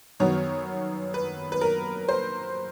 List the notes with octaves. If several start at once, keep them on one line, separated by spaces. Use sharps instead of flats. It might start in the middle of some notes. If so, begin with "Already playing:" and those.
F#2 D#3 F#3 B3 C#5
B4
B4
A#4
C5